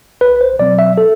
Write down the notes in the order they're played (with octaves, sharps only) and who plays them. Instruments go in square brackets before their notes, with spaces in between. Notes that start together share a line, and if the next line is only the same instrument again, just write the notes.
[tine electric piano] C2 B4
C5
B2 F#3 C4 D5
E5
A4